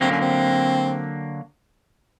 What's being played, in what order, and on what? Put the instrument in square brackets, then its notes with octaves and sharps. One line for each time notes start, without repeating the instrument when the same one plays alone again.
[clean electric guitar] D3 F#3 A#3 [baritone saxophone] C4
[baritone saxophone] C#4
C4